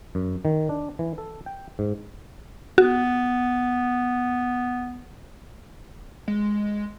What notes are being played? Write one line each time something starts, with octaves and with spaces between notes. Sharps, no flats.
F#2
D#3
D4
E3
A4
G5
G#2
B3 F#4
G#3